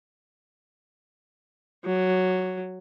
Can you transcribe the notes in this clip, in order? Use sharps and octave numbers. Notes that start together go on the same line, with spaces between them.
F#3